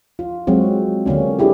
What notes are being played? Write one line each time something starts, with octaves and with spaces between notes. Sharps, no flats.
F4
F#3 G#3 C4 F#4
D3 A#3 C#4 D4
C#4 D4 E4 G4 G#4